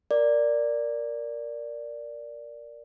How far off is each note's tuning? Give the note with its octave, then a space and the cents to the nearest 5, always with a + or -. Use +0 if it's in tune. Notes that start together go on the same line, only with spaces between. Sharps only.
A#4 +0 D5 +0